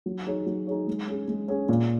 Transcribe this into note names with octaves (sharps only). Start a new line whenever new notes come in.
F#3
D#4 G#4 C#5
F#3
D#4 G#4 C#5
G#3
C#4 G#4
G#3
C#4 G#4
A#2